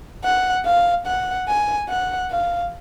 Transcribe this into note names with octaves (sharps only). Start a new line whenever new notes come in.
F#5
F5
F#5
G#5
F#5
F5